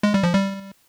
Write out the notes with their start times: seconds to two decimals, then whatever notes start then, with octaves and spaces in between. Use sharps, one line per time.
0.03 G#3
0.14 G3
0.23 F3
0.34 G3